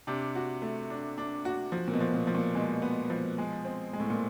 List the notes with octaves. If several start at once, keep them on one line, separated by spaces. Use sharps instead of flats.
C3 D4
F#4
A3
D4
D4
F#4
F3
A#2
B2
F3
A#2
F3
A#2
B2 G#3
B3
F3
G#3
C4
G#3
A2
A#2